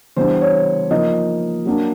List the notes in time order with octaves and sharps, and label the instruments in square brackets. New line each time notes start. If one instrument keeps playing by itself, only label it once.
[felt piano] E3 G3 B3 D4 C5
C#5
F3 A#3 D#4 D#5
F#3 A#3 D4